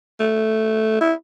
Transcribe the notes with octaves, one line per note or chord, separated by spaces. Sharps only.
A3
E4